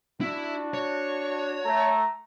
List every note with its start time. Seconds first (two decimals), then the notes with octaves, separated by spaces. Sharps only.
0.21 D4 E4 F#4
0.74 C#5
1.65 A3 A#5